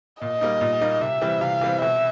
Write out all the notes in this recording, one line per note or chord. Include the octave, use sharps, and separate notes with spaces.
A#2 D#5
G3 A#3 D#4
A#2
G3 A#3 D#4
C3 E5
E3 G3 C4
C3 F5
E3 G3 C4
B2 E5